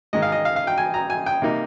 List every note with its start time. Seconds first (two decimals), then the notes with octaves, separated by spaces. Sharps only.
0.13 G#2 D#3 G#3 D#5
0.22 F5
0.32 D#5
0.45 F5
0.56 F5
0.67 G5
0.78 G#5
0.94 A#5
1.10 G#5
1.26 G5
1.42 C3 G3 A#3 D#4